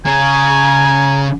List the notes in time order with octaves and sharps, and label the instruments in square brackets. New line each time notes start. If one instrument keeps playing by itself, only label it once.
[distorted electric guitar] C#3 [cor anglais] G#5 [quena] A#5